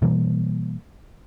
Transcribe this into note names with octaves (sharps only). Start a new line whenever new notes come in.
B2 E3 G3 A#3